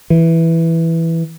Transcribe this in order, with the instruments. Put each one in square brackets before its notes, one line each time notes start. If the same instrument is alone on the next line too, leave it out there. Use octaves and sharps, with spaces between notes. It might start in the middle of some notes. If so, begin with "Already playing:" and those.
[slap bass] E3